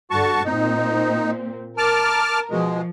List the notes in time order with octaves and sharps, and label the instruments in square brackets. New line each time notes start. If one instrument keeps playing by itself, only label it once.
[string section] G2 D3 [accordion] F#4 A5 C#6
[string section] A#2 C4 [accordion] D#4
[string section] A#4 [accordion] A5 D6 F6
[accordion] B2 G#3 [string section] F3